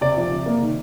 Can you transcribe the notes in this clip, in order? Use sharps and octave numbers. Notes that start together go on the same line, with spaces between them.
C3 D5
F3
C3
A#3
D#3